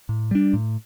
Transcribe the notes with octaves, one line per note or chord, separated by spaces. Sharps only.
A2
G3 D4
A2